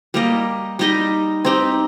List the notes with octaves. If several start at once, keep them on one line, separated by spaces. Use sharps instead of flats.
G3 A#3 G4 D#5
G3 D#4 G4 D#5
C4 D#4 G4